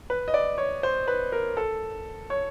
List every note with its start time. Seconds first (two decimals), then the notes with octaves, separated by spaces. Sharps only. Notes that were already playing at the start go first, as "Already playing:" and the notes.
0.10 B4
0.28 D#5
0.34 D5
0.58 C#5
0.83 C5
1.08 B4
1.32 A#4
1.57 A4
2.30 C#5